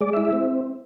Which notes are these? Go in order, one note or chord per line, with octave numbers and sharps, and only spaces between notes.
G#3 D5
E5
E4
E5
C4